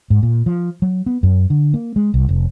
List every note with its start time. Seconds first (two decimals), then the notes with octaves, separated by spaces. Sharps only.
0.10 G#2
0.23 A#2
0.46 F3
0.82 F#3
1.06 B3
1.23 F#2
1.50 D3
1.74 A#3
1.96 G#3
2.14 C2
2.29 F1